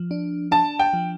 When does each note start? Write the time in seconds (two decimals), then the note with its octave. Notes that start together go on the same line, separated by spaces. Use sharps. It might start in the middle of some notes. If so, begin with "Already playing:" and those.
Already playing: F3
0.11 D4
0.51 D4 A5
0.79 G5
0.93 F3